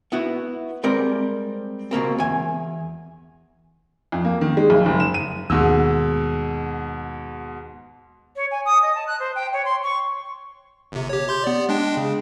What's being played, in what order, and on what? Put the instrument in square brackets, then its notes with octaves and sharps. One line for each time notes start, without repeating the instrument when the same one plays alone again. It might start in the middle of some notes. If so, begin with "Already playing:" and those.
[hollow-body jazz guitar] B3 E4 F#4
G3 G#3 C4 A#4 D5 A#5
C#2 B2 A#3 C4
E2 G#5
[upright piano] F2
A#3
D#3
G#3
B1
F#1
E7
D#7
[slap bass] D#2 [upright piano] G#2 B2 E6
[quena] C#5
G#5
D#6
D#5
A5
F#6
C5
G5
C#5
C6
C#6
[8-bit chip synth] G1 C3
G4 C#5
G4 C6 G6
B3 D5
G#3 D4 G5
C#3